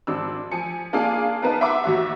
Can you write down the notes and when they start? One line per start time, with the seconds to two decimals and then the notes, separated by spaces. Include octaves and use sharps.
0.07 G#1 D4 E6
0.52 F3 G#5 C#7
0.93 A#3 D4 F4 G#4 F5 G#5
1.42 B3 D#4 A#4 B4 A5
1.61 E5 F#5 C6 D6
1.84 D#2 F#4 E5